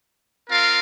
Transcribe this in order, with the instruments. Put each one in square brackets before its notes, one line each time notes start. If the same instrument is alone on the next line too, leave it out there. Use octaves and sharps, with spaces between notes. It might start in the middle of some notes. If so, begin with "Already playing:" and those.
[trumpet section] C4 F4 A#4 F5